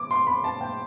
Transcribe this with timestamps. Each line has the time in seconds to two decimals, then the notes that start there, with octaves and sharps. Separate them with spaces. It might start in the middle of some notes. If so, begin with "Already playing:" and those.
Already playing: D6
0.11 C6
0.27 B5
0.44 A5
0.61 G5